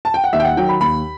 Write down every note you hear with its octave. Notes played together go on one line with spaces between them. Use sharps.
A5
G5
F#5
D#2 E5
G5
F#5
D#3 F#3 G5
B5
D#2 B5